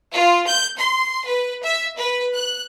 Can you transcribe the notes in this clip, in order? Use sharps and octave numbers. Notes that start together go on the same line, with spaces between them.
F4
G6
C6
B4
E5
B4
F#6